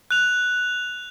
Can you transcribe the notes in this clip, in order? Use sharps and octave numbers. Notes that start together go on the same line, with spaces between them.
F#6 F7